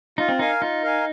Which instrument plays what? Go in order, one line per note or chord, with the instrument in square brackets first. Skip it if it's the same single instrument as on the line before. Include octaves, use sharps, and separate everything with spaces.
[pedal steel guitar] D#4 [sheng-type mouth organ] F4
[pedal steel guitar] C4
[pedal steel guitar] D#4 [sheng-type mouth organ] A#4 F5 G#5
[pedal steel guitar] D#4 [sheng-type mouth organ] F4
[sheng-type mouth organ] A#4 F5 G#5